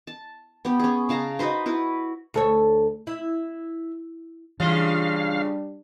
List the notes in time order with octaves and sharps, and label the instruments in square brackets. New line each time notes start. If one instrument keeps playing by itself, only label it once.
[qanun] A5
B3 G4
C#4 G#4
C#3 F5 A5 A#5
D#4 F#4 B4 C5
E4 F#4 B4
[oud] D2 A4 C#5
E4
[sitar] C#3 F4 D#5 [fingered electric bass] E3 [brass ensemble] G3 D4 [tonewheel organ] F5